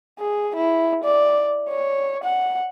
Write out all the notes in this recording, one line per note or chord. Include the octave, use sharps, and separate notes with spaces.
G#4
E4
D5
C#5
F#5